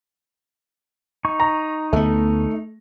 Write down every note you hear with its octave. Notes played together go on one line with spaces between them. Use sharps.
D#4 C#6
A#5
D2 A3 B3